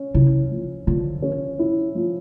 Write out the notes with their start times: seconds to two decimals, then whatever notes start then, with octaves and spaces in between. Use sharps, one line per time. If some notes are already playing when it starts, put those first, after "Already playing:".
Already playing: C#4
0.14 C#3 E4
0.51 F3
0.87 D3 F3
1.22 C#4
1.59 E4
1.95 F3